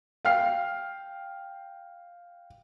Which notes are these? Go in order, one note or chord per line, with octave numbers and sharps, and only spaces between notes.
F5 G5 F6 C7